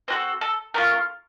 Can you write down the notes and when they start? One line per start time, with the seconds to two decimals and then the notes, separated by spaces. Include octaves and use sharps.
0.08 C4 F#4 A4 C5
0.41 A4
0.74 A3 C#4 F4 A#4